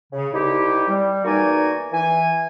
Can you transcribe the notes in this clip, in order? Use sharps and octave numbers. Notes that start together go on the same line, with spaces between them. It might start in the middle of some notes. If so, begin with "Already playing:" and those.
C#3
C2 D#4 E4 G4
G3
E2 A#3 D#4 F#4 D5 G#5
E3 G#5